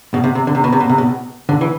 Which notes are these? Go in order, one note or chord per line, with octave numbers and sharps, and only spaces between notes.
B2
C3
C3
D3
C3
B2
C3
B2
C3
B2
D3
E3